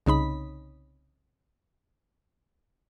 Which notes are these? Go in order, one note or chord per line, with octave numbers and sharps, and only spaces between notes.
C2 C#3 D#4 B5